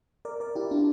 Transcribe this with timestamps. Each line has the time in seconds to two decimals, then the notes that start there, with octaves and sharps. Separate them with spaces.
0.25 A#4 D5
0.40 A#4 D5
0.55 E4 G4
0.71 D4 F4